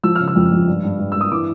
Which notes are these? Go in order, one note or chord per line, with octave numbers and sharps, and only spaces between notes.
F3 E6
C#3 F6
E6
F2
F2
G2
G2
G2
G2 E6
D#6
E3 D6